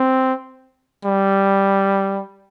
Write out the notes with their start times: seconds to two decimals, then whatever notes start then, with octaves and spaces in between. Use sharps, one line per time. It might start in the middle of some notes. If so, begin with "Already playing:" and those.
Already playing: C4
1.05 G3